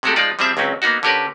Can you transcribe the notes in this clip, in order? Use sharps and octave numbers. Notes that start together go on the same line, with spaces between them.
C3 G#3 A3 F#4 G4 A4
F3 G#3 D#4 F4 D5
F3 G3 C4 G#4 E5
C#2 F#3 C4 C#4
A#3 B3 D#4 F#4
D3 C#4 G4 A#4 B4